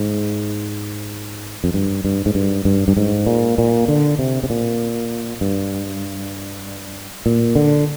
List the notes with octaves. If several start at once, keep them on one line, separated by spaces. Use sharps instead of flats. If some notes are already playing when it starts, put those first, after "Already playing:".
Already playing: G#2
F2
G2
G2
G#2
G2
G2
G2
G#2
A#2
A#2
D3
C3
C3
A#2
G2
A#2
D3